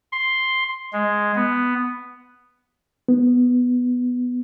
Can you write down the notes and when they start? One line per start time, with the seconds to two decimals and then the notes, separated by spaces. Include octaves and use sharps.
0.12 C6
0.93 G#3
1.36 B3
3.08 B3